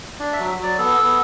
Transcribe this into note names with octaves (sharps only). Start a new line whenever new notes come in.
D4
E5
F#3
F#3
D5
B3 A4
B3